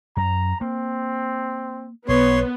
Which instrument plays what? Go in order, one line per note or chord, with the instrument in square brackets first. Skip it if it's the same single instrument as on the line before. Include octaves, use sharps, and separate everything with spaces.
[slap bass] F#2 [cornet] A#5
[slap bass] A#3 [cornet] C4
[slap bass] B1 [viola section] B3 [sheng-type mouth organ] C#5 C6